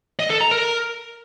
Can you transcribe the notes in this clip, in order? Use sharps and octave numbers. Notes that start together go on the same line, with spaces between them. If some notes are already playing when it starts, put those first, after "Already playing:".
D#5
A4
A#5
A#4